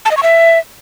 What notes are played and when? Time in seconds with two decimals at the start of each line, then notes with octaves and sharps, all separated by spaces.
0.05 A5
0.11 D#5
0.17 C#6
0.23 E5